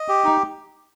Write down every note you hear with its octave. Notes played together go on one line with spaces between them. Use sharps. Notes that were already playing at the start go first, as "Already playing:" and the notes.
Already playing: D#5
G4
D#4